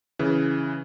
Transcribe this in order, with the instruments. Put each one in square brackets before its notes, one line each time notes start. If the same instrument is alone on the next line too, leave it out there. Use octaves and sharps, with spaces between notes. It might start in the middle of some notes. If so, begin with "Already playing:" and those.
[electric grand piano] C#3 E3